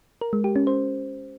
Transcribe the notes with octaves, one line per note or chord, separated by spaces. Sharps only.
A#4
G#3
G4
C#4
C5